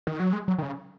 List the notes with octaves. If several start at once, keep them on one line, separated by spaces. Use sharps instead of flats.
D#3
F#3
G#3
F#3
D#3
C#3